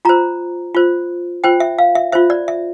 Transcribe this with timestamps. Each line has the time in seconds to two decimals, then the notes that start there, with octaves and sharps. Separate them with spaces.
0.05 F4 C5 A#5
0.75 F4 C5
1.44 F4 C5 G5
1.60 E5
1.79 F5
1.95 E5
2.12 F4 C5 E5
2.30 D5
2.48 E5